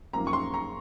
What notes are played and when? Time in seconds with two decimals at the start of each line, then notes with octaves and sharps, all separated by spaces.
0.13 F#2 F3 A#3 D#4 A#5
0.27 C#6
0.33 C6
0.54 A#5